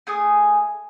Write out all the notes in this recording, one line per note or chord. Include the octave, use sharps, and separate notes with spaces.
A3 G#4 G#5 D#6